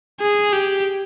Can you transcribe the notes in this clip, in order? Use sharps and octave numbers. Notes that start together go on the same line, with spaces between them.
G#4
G4